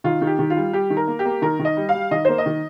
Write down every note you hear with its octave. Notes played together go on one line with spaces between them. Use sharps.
D#3 F4
D#3
G4
D#3
F4
G3
G3 G4
D#3
A#4
A#3
G4
A#3
D#3 A#4
D#3
D#5
G3
G3 F5
D#3 D#5
A#3 C5
D#5
D#3